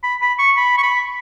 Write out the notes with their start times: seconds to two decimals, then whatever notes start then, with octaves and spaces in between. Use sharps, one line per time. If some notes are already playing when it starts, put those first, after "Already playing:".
0.03 B5
0.21 B5
0.39 C#6
0.56 B5
0.78 C#6
0.83 B5